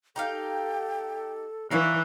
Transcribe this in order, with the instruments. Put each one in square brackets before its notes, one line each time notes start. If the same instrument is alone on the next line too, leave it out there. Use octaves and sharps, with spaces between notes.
[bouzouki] D#4 G4 F5 [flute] A4 [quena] G5
[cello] E3 [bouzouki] D#4 C#5 D5 [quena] F5 [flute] F#6